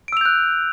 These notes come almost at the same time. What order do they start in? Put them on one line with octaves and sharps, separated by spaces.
D7 E6 F7 G6 F#6